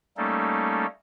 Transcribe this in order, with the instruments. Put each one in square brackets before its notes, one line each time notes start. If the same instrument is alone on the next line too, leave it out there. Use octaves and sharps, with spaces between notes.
[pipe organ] G3 A3 A#3 C#4 D#4 A4